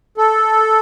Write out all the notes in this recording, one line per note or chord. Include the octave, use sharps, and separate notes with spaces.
A4